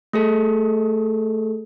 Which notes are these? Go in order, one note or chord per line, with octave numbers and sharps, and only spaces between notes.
A3 G#4 A4